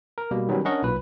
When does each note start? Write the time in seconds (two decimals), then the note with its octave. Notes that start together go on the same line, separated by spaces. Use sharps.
0.18 A#4
0.31 B2 G3 A#3
0.48 D#3 F#3 G3 B3 C#4
0.65 C#4 D4 A#4 D#5 F#5 C#6
0.83 B1 A#2 B4